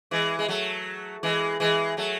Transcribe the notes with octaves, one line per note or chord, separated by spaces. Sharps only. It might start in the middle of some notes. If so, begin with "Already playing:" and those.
E3 G#3
G#3
F#3 A3
E3 G#3
E3 G#3
F#3 A3